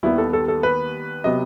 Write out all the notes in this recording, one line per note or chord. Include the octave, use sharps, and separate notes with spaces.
D#2 D#3 G3 B3 E4
A4
A4
A4
B4
C3 F#3 B3 D#5